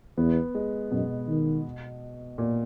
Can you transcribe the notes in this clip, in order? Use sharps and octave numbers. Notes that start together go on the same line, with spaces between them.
E2 B3
G#3
F#2 B2
D#3
A#2